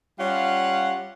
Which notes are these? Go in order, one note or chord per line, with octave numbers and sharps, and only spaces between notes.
G3 C#4 F4 F5 F#5